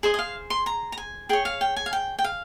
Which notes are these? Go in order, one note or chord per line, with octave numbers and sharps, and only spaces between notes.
G#4 C5 D#5 G#5
D#5
F5
C6
A#5
A#5
G#5
G#4 C#5 G5
F5
G5
G#5
F5
G5
G5
F5